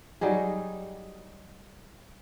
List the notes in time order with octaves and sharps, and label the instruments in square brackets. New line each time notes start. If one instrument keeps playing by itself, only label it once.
[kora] F#3 G3 D#4 G#4